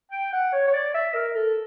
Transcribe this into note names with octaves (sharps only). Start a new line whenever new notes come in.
G5
F#5
C#5
C#5
D5
E5
A#4
A4